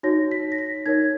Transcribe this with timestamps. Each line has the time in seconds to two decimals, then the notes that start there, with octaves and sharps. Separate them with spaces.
0.03 D#4 F#4 C#5 A#6
0.31 B6
0.52 A#6
0.58 B6
0.86 D#4 A#4 C#5 G#6